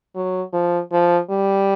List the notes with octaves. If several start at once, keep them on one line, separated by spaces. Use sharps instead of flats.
F#3
F3
F3
G3